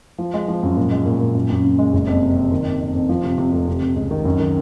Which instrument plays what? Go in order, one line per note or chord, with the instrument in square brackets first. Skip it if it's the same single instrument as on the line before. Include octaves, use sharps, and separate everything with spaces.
[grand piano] F3
G#3
F3
F#2
A#2
G#3
A#2
A#2
F#2
F#2
C#3
G#3
F#1
F2
C3
C3
D#3
F2
F2
F2
F3
C3
C3
F1
C3
C3
C#2
D#3
F#2
D#3